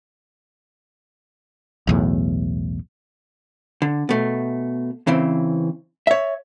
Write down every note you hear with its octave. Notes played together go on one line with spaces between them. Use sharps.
B1 E2 A2
D3
B2 A3
C#3 E3 C4
C#5 E5